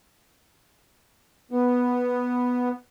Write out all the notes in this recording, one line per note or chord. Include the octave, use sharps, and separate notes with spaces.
B3